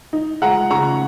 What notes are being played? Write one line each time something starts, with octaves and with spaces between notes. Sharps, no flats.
D#4
G#3 F#5 A#5
C#3 A#5 C#6